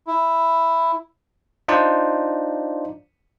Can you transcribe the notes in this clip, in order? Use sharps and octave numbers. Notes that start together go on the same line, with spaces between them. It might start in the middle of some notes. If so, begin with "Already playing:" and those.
E4
D4 D#4 F4 C5 D5